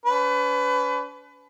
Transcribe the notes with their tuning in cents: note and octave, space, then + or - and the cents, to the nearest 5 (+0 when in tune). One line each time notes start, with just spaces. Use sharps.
C#4 +45 B4 +25